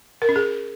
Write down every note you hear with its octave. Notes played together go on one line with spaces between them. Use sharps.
A#4
C#4
G#4